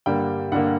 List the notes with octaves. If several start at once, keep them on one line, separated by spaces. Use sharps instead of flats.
G2 D3 G3 A#3 G5
G2 D3 G3 A#3 F#5